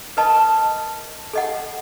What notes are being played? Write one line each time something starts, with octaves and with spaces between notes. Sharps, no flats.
A#4 B4 D#5 A5
A4 D#5 F#5